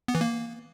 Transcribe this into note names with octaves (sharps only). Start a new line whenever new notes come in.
B3
E3
A#3